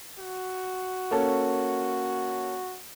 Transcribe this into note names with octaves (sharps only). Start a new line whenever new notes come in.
F#4
A#3 C#4 A4